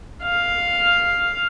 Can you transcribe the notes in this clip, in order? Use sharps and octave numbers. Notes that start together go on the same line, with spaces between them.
F5